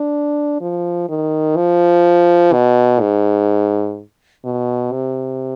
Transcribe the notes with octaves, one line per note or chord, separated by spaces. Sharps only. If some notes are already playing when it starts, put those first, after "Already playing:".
Already playing: D4
F3
D#3
F3
B2
G#2
B2
C3